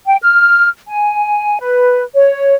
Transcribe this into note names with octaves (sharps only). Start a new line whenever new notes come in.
G5
F6
G#5
B4
C#5